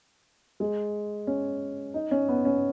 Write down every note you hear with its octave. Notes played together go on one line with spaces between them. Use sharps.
G#3
C#4
D#4
C#4
B3
C#4